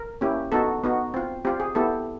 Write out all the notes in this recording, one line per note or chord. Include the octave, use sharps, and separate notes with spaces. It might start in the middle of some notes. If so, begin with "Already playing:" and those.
Already playing: A#4
A#3 C#4 E4 G4
B3 D#4 F#4 A4
B3 D#4 F#4
C4 F4
C4 F4 G4
G#4
B3 E4 G4 A4